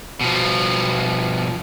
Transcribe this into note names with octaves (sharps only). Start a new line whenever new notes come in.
B2 F3